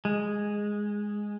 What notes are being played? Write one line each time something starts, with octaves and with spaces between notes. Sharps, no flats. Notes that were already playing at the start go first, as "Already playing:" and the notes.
G#3